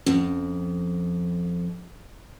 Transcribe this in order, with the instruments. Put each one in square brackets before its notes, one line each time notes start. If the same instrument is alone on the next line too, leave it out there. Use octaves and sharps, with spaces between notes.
[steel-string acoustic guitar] F2 [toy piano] C#4